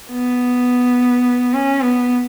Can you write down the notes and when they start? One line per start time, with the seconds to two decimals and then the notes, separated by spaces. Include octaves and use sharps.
0.11 B3
1.53 C#4
1.82 B3